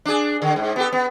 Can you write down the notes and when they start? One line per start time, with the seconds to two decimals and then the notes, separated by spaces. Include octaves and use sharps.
0.06 D4 G#4
0.42 D3
0.56 G#2
0.76 B3 G4 A4
0.92 B3